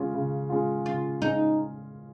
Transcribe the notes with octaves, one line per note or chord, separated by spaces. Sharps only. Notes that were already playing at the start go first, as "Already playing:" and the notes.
Already playing: C#3 G#3 C#4 F4
C#3
G#3 C#4 F4
C#3 F4
G#3 C#4 D#4